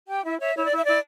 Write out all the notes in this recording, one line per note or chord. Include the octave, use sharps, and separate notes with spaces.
G4 G5
E4 E5
C#5 E5
E4 C#5
D5
E4
E5
E4 D5